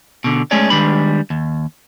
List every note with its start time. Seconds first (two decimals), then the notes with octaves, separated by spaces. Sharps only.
0.24 B2 D3
0.51 G#3 A3 C#4 G#4 C#5 D5
0.70 D#3 G3 G#3 D4 B4 B5
1.30 D#2